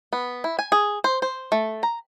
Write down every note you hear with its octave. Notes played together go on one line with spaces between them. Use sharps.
B3
E4
G#5
G#4
C5
C5
A3
A#5